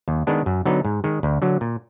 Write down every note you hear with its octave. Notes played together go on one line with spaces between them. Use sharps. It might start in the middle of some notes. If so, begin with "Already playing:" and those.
D#2
D#3 G#3 B3 D4
F#2
D3 F#3 B3 D#4
G#2
D#3 G#3
D2
D3 F#3
A#2